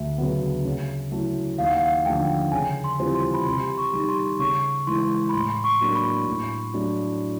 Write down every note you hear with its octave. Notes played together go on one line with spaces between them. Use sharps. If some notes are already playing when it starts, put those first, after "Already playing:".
Already playing: D2 E5
C#3 F#3 B3
C#3
F#3 A3 C#4 E4
D#2 F5
F#5
F5
D3 F3 A3 G5
C#3 G#5
C6
E3 G3 C4 F4
C6
B5
C3 C6
C#6
D#3 G3
C6
C#3 C#6
E3 G#3 C6
B5
A2 C6
C#6
F#3 A#3 D4
B5
A2
F#3 A3 D4